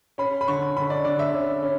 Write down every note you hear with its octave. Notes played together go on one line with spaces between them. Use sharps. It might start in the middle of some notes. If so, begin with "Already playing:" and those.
C#4 B5
B5
D3 C#6
D3 B5
D5
D3 D5
E5
C#4
C#4